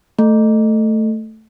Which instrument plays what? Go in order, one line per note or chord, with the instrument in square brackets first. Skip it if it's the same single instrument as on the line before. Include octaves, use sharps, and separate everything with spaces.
[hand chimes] A3